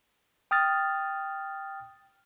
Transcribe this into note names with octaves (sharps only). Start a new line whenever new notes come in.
G5 D#6 F6 A6